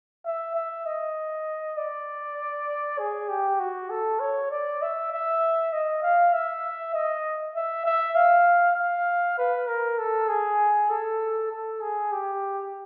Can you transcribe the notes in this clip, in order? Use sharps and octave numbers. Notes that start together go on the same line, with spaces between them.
E5
E5
D#5
D5
G#4
G4
F#4
A4
C#5
D5
E5
E5
D#5
F5
E5
D#5
E5
E5
F5
F5
B4
A#4
A4
G#4
A4
A4
G#4
G4